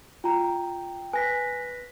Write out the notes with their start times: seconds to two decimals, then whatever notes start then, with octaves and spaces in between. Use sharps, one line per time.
0.24 F4 G5 A#5
1.13 B4 G#5 A#6 B6